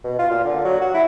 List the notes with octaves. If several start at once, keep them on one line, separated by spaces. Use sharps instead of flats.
B2
F4
A#2
D3
F#3
F#4
E4